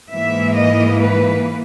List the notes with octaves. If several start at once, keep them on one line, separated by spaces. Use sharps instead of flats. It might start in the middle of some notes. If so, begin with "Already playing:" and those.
G#2 E3 A#3 E5
D#5
B4